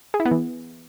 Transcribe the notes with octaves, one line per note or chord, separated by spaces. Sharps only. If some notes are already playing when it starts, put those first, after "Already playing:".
G#4
E4
B3
E3